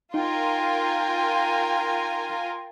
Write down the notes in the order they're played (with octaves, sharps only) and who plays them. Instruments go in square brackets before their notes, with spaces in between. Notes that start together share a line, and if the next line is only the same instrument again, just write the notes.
[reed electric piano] D#4 [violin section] F4 A#4 G#5 [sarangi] G5